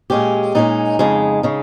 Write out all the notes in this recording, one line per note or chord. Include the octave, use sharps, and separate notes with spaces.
A#2 G#3 C#4 G4
A#2 G#3 C#4 D#4
F2 C#3 G#3
C#3 G#3